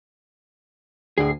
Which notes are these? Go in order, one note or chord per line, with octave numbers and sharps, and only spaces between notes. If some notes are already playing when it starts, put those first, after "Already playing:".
D2 A2 G#4 C7